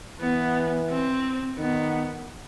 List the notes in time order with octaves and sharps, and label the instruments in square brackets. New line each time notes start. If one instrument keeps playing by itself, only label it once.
[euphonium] E3 [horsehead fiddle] B3
[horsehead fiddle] C4
[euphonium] D#3 [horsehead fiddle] B3